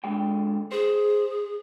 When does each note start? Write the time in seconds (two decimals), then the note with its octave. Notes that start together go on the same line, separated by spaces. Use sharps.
0.04 D3 G#3 G5
0.72 G#4 C5